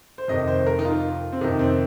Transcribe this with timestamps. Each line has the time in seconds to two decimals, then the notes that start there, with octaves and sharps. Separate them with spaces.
0.18 C5
0.28 F2 C3 D#3 D#5
0.48 C5
0.67 A#4
0.79 D#4
0.85 F4
1.33 C4
1.41 F2 C3 D#3 D#4
1.59 C4